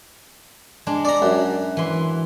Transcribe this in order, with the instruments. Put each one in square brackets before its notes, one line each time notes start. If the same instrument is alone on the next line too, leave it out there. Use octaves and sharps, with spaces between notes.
[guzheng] G#3 D4
[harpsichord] D5 A#5
F#2
[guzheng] E3 C6